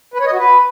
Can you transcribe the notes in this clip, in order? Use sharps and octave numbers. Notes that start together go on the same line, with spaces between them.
B4
C#5
D#5
F#4
B4